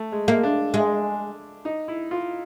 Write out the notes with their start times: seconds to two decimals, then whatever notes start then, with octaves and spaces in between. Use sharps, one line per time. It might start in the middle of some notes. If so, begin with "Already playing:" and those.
Already playing: A3
0.12 G#3
0.28 G#3 A#3
0.43 D4
0.74 G#3
1.65 D#4
1.88 E4
2.11 F4